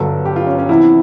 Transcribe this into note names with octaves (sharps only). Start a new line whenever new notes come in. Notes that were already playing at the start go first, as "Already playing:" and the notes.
Already playing: G1 G2 D3 F#3 A4
G4
F4
C#4
C#4
E2 C3 E3 E4